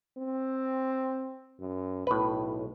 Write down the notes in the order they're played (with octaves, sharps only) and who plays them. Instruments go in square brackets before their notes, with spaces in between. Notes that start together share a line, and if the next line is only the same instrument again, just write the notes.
[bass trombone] C4
F#2
[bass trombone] B1 [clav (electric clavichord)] A2 B4